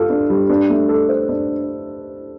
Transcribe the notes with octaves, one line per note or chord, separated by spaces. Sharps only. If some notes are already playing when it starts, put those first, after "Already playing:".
Already playing: G3 F4 A4
D4
G3
D4
A3
A4
C5
D4